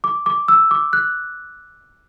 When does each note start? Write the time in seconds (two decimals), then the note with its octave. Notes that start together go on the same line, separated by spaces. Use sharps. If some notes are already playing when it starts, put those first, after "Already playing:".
0.04 D6
0.26 D6
0.48 E6
0.71 D6
0.93 F#6